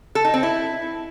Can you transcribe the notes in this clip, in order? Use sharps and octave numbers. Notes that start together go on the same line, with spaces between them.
A4
D#4
C4
E4